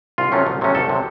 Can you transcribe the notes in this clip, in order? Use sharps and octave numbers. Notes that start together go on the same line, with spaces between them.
C2 F4
C3 F#3 A3 C#4
C2
C3 F#3 A3 C#4
C2 A4
C3 F#3